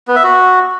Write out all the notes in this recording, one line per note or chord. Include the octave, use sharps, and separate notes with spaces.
B3
E5
F#4